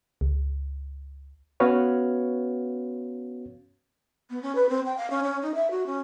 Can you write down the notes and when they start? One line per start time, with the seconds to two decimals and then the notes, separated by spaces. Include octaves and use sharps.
0.21 C#2
1.60 B3 C#4 F#4 B4 C#5 F5
4.30 B3
4.43 C#4
4.55 B4
4.69 C4
4.86 G5
4.97 F5
5.10 C#4
5.24 C#4
5.42 D#4
5.55 E5
5.71 F#4
5.86 C#4